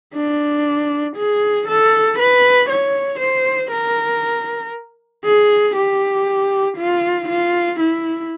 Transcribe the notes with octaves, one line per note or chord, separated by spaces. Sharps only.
D4
G#4
A4
B4
C#5
C5
A#4
G#4
G4
F4
F4
E4